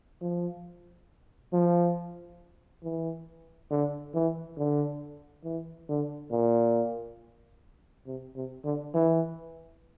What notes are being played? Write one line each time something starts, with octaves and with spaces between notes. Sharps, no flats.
F3
F3
E3
D3
E3
D3
E3
D3
A#2
C3
C3
D3
E3